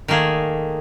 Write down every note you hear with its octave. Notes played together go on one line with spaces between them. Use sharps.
D#3 A3 A#3 G#4